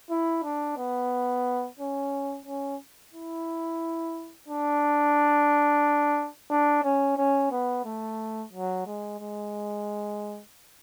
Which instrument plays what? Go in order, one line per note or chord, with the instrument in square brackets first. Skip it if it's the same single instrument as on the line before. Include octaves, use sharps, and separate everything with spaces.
[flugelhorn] E4
D4
B3
C#4
C#4
E4
D4
D4
C#4
C#4
B3
A3
F#3
G#3
G#3